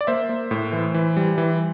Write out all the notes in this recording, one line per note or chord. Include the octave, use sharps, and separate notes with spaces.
D5
A#3 C5 E5
A#3
A2
E3
E3
G3
E3